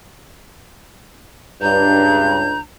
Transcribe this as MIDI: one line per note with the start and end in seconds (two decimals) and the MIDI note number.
1.62 2.61 37
1.62 2.45 43
1.62 2.61 62
1.62 2.61 82
1.62 2.58 91